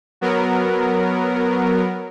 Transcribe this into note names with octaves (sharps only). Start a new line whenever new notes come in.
F#3 B3 A#4